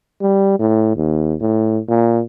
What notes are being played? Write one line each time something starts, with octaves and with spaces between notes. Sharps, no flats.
G3
A2
D#2
A2
A#2